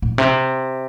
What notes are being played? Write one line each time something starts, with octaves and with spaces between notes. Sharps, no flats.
A#2
C3